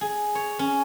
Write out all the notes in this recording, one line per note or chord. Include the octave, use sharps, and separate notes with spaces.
G#4
C#5
C#4